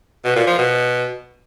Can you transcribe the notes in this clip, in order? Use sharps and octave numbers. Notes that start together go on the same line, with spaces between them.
B2
A#2
F3
B2